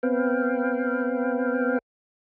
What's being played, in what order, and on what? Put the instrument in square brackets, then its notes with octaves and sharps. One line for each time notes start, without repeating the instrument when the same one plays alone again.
[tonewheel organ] B3 C4 B4 F5 G5